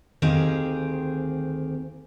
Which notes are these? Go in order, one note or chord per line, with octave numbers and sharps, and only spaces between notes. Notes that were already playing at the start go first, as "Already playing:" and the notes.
D2 D#3 C4 G4 G#4 F5